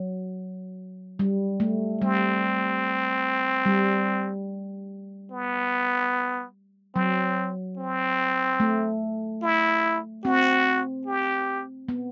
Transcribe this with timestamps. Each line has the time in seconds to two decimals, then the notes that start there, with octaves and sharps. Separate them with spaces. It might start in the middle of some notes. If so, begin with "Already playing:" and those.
Already playing: F#3
1.19 G3
1.60 A3
2.01 G3 C4
3.66 G3
5.30 B3
6.95 F#3 C4
7.77 C4
8.60 A3
9.42 E4
10.24 C4 F#4
11.06 G4
11.89 B3